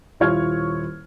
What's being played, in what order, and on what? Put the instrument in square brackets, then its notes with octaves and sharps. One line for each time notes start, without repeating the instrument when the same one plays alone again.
[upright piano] D#1 E4 F4 C#5 F6 G#6